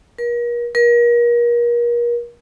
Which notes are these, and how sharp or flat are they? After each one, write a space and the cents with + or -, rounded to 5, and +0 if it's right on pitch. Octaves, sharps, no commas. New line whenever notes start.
A#4 +40
A#4 +35